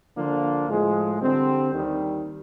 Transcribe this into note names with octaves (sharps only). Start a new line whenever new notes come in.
D3 F3 A#3 D4 F4
A2 F3 G#3
D3 G3 C4
D#2 D#3 G3